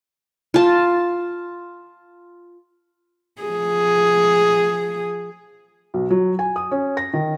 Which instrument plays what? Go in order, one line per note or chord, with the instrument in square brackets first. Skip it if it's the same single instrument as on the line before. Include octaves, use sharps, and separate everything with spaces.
[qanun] F4 A5
[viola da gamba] F3 G#4
[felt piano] B1
F#3
G#5
D#6
C#4
A#6
D#3